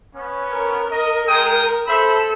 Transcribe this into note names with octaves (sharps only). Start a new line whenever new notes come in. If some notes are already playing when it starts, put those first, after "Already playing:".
B3 C#4
A#4
D#5
G#3 A#4 G5 D#6
A4 C5 E5 B5 E6